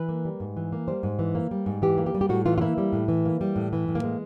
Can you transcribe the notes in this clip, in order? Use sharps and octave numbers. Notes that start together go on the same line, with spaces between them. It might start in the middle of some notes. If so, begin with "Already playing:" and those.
Already playing: E3 B4
A#3
G3
G#2
E3
A#3
G3 C5
G#2
E3
A#3
G3
G#2
E3 G4
A#3
G4
G3
G4
A2 F#4
E3 F4
F4
A#3 E4
G3
A2
E3
A#3
G3
A2
E3
A2
A#3
G#3